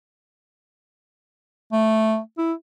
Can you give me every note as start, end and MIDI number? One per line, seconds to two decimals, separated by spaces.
1.72 2.19 57
2.38 2.53 64